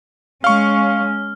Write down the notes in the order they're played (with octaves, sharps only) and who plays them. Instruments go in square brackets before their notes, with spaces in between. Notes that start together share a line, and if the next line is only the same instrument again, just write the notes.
[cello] G#3 C#4 [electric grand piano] F5 C#6 [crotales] F6